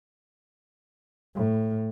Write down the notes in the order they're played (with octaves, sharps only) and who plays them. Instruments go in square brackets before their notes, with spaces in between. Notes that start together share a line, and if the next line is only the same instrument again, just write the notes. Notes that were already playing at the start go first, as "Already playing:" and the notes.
[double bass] A2